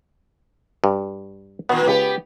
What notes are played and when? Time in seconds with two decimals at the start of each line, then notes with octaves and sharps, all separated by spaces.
0.84 G2
1.69 A#2 D#3 B3
1.88 C#2 B3 G4